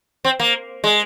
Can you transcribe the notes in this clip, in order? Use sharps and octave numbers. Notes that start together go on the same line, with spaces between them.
C4
A#3
G#3